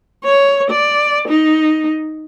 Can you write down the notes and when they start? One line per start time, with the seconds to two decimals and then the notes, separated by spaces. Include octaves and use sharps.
0.24 C#5
0.70 D5
1.28 D#4